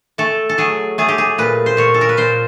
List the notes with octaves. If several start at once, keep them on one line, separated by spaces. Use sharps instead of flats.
A3 A4
A4
F#3 G#4
A3 G#4
G4
G#4
A#2 B4
C5
A#2 C#5
A4
A#4
B4
A#2 C5